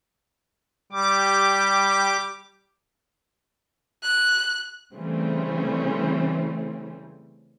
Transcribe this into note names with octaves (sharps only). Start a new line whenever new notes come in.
G3 G4 D6
F#6
C#3 E3 G3 A3 C4 C#4